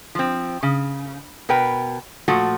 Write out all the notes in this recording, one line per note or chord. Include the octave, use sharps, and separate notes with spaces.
F3 C4
C#3
B2 A#4 B4 G5
A#2 F3 A3 F#4